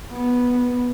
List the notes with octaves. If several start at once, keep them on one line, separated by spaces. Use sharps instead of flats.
B3